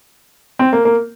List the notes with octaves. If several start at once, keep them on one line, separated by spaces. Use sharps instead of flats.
C4
A#3
A#3